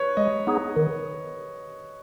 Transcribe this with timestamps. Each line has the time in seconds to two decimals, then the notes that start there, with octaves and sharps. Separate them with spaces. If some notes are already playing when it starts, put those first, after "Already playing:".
Already playing: B4 C#5
0.17 G#3 D#5
0.47 B3 D#4 G#4
0.76 D#3